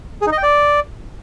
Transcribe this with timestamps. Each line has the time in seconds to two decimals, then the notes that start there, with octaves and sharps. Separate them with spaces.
0.21 G#4
0.27 D#4
0.32 D#5
0.38 G5
0.43 D5